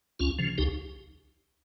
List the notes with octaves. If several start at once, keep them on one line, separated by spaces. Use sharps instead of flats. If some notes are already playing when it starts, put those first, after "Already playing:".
C#2 C#4 F4
C#3 F3
C#2 D#4 G4